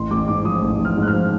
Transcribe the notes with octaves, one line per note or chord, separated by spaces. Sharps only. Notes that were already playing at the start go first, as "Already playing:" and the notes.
Already playing: A1 C6
A1 D6
G#2 D6
F3 D#6
A1
A1
F6
G#2
F#6
F6
F3